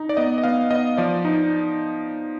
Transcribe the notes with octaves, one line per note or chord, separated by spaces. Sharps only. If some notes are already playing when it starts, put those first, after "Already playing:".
Already playing: D#4
D5
B3 D#5
D#5
B3 F5
B3 D#5
F3 D5
D#4